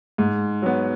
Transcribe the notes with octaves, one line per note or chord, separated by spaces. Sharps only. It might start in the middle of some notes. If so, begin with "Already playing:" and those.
G#2
F#3 B3